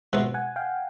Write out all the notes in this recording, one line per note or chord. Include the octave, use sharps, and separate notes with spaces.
B2 G#3 C4 D#4 E5 F#5
F#5 G#5
F5 G5